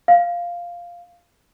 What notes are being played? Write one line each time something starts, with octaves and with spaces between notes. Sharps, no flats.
F5